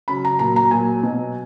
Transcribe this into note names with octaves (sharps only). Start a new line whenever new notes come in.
C#3 F#3 B5
A#5
A#2 F#3 A#5
A#5
A#2 F#3 G#5
B2 F#3